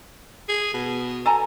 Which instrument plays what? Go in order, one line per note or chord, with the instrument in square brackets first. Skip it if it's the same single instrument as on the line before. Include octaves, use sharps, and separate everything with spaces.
[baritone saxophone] G#4
B2
[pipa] A4 G#5 A#5